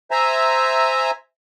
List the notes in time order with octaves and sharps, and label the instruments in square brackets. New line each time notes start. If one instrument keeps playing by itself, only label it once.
[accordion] C5 E5 G#5 A#5